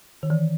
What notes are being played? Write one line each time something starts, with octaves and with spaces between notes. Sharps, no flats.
D#3
E3